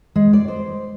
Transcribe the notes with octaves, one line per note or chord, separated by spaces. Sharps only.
G#3
D5
C5